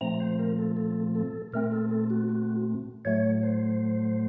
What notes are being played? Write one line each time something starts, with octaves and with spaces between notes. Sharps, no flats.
A#2 F3 A3 C4 A#5
C5
A#4
A4
A4
A4
A#2 A3 C4 A#4
A4
A4
F#4
F#4
A2 F#3 A3 C#5
C5